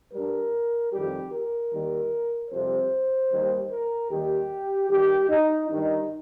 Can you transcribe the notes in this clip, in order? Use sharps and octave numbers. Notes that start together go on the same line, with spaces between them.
G2 G3 A#4
F2 D#3 G3 G4
A#4
D#2 D#3 G3
F2 C3 G3 C5
D#2 D#3 G3
A#4
D#2 D#3 G3 G4
G2 D#3 G3 G4
D#4
G2 D#3 G3 D#4